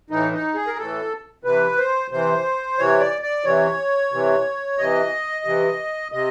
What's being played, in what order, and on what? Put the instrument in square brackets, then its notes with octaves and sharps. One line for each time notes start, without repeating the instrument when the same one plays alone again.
[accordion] A2 E3 D#4
D#4
G#4
A#4
A2 E3 A4
C3 E3 B4
C5
C3 E3 C5
C3 E3 C#5
D5
D5
C3 E3 C#5
C3 E3
C3 E3 D#5
C3 E3
C3 D#5